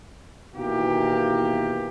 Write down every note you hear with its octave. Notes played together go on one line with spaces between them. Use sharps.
B2 D#3 E3 A#3 G4